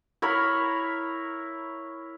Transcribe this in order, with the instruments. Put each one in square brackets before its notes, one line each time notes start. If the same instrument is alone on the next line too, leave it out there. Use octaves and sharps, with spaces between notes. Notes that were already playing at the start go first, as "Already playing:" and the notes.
[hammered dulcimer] E4 A#4 C#5 B5